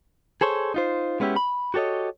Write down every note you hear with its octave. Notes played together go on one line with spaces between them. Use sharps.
G#4 A4 C5 C#5
D#4 F4 C5
G#3 B3 C#4 E4 G4
B5
F#4 G4 A4 C#5 D#5